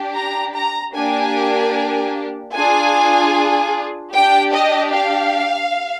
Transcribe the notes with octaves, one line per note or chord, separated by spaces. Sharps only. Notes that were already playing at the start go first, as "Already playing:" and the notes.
Already playing: D4 G4
A#5
A#5
A#3 D4 G4 G#5
D4 F4 G#4 G#5
D4 G4 G5
D#5
F5